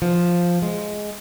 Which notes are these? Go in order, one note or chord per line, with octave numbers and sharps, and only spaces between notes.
F3
G#3